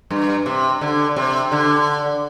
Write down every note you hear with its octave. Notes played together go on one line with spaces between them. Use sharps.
G2
C3
D3
C3
D3